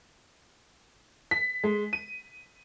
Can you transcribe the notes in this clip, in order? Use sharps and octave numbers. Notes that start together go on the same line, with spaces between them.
B6
G#3
D#7